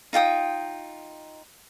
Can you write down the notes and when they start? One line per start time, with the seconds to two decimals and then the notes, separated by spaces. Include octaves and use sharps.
0.13 D#4 F4 G5 D#6